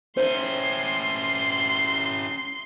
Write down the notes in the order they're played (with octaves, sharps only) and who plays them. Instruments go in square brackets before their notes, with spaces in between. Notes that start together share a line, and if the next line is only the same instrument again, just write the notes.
[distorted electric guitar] C#4 E4 [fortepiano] C5 [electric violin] C6